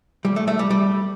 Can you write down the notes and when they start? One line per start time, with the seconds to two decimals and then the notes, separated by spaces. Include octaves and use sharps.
0.25 G3
0.36 A3
0.48 A3
0.59 G3
0.70 G3